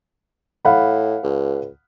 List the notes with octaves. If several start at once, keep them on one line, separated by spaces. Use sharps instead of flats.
A2 F5 F#5 B5
C#2